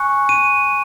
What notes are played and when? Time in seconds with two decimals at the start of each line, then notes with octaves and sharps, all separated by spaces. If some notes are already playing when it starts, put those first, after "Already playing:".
Already playing: G#5 C#6 F#6 C#7
0.29 D#7